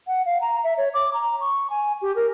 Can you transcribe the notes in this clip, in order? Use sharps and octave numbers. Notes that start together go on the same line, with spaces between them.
F#5
F5
A#5
E5
C#5
D6
A#5
C#6
G#5
G4
A#4